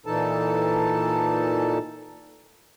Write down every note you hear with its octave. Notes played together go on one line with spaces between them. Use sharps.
A#2 E3 D#4 A4 A5